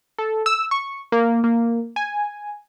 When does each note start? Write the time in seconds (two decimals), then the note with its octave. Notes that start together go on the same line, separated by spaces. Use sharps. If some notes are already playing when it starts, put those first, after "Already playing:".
0.19 A4
0.46 E6
0.71 C#6
1.12 A#3
1.44 A#3
1.96 G#5